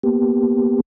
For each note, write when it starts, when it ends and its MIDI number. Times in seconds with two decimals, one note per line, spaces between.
0.03 0.81 58
0.03 0.81 59
0.03 0.81 67